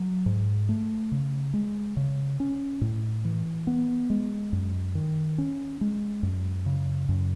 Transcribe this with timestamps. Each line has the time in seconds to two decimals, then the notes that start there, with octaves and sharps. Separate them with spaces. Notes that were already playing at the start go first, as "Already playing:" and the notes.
Already playing: F#3
0.26 G#2
0.69 A3
1.12 C#3
1.54 G#3
1.97 C#3
2.40 C#4
2.81 A2
3.25 E3
3.67 B3
4.10 G#3
4.53 F#2
4.95 D#3
5.38 C#4
5.81 G#3
6.23 F#2
6.66 C#3
7.09 F#2